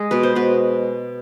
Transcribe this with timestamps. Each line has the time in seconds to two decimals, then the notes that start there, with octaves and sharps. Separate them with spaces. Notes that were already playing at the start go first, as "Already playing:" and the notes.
Already playing: G#3 G#4
0.11 B2 B4
0.23 C5
0.35 B2 B4